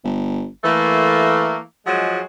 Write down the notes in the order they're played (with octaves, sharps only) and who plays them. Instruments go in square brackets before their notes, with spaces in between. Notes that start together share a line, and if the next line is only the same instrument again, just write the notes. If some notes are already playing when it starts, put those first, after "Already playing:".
[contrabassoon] G1
[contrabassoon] E3 [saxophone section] A3 A#3
[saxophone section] F3 F#3 G#3